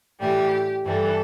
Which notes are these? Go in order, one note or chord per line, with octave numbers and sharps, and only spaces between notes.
A2 E3 G3 G4
G2 E3 G3 A4